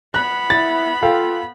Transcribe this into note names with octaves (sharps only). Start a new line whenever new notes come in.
B3 B5 F#6
E4 A6
F4 A4 F5 G5